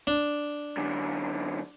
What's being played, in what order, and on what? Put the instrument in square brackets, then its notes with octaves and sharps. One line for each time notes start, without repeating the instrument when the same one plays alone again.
[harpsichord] D4
[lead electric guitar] F#2 D3